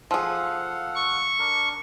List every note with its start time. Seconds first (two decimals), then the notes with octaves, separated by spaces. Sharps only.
0.11 F3 G#4 A4 F5 F#5
0.95 C#6
1.39 D4 A#4